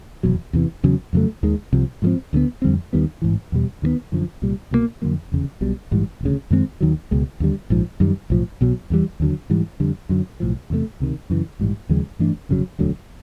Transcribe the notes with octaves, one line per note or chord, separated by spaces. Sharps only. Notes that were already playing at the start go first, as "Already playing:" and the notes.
F1 E2 B2 F#3
E2 C3 E3
E2 C#3 F#3
F2 C#3 F#3 A3
D#2 D#3 G#3
C2 C3 F3
G#2 F3 G#3 C4
D2 D3 F#3 B3
F2 D3 G3 C4
D#2 D#3 G3 B3
A1 G#2 E3
E2 B2 G3
D#2 D#3 F#3 B3
F#2 D3 F3
C2 A#2 G3
C2 B2 F#3 A#3
F2 D3 F#3 A#3
F1 E2 C#3
B1 B2 G3
A#1 G#2 E3 G3
E1 D2 C#3
F#2 D#3 G#3 C4
D#2 D#3 F#3
C#2 B2 G#3
D#2 D3 G3
A#1 G#2 F3
F#2 D#3 G3
B1 A2 F3
B1 B2 F#3
E2 C3 E3 G3
D#2 D3 F#3
G#2 E3 G3
F2 D3 G3
F#2 D3 F#3
B1 A2 F3
E2 C3 E3 A3
C#2 C3 D#3
F#2 C#3 E3
A#1 G#2 E3 G3
D#2 C#3 F3 G#3
G2 E3 A3 D4
G1 F2 C#3 F#3
E1 D2 D3 F#3